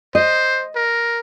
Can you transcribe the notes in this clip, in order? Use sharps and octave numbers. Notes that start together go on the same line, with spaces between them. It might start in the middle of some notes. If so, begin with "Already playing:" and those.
C5 D#5
A#4